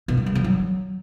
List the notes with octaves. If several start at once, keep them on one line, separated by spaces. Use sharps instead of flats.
B2
G3
C#3
F3
F#3